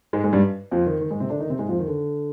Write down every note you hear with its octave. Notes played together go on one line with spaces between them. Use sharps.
G#2 G#3
G#2 G#3
G2 G3
F2 F3
D#3
D#3
G#2 G#3
C3 C4
D3 D4
D#3 D#4
C3 C4
G#2 G#3
F2 F3
D#3
D3